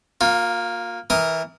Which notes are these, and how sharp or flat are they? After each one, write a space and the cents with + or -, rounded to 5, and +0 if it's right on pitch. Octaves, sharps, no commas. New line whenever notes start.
A#3 +0 F4 +35
E3 -20 A#4 +0 D#6 +0